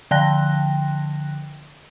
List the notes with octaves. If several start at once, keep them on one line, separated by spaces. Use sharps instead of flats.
D3 F3 G5 F#6 A#6